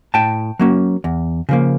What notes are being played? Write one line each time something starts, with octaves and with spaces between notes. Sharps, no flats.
A2 G5 A5
F#3 A#3 C#4
E2
C#3 F3 A#3